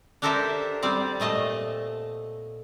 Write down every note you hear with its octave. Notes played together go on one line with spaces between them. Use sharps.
D4 G4 A4 A#4 C5 E5
G3 C4 D5
A#2 A3 D#5 A5